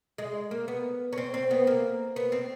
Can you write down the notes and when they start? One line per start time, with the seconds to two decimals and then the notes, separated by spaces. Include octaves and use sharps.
0.18 G#3
0.51 A#3
0.68 B3
1.13 C#4
1.18 C4
1.34 C4
1.51 B3
1.67 A#3
2.16 B3
2.32 C4